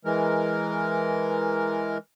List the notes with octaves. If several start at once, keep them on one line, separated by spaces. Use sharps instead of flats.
E3 G#3 A#4